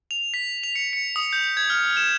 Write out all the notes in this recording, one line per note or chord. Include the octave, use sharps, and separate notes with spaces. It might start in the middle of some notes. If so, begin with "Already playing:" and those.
F7
B6
F7
C#7
C#7
D#6
G6
G#6
F6
E7